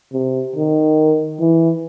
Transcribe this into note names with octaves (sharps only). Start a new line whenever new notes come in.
C3
D#3
E3